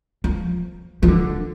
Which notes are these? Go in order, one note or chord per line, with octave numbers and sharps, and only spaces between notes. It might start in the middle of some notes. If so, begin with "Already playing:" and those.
F3
F3
D3